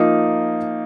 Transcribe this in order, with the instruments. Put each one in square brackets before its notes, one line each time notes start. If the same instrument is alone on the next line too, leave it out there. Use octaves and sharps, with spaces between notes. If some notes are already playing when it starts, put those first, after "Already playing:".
Already playing: [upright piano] F3 A#3 D#4